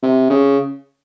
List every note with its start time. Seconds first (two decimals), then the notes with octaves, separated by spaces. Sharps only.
0.03 C3
0.30 C#3